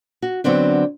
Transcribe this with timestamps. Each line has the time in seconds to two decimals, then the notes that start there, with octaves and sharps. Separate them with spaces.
0.22 F#4
0.44 D3 F#3 B3 C4 D4